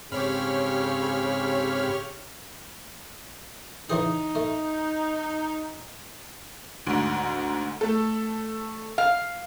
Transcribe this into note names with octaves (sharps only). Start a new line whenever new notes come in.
G#2 C#3 C4 G4 C#5 B5 F6
C#3 E3 D#4 G#4
A3
D2 G#2
A3 A4
F5